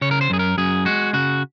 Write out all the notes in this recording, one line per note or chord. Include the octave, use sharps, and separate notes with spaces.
C#3 C#5
A#4
C5
F#2 G#4
A#4
F#2 G#4
G#3 F#4
C#3 F#4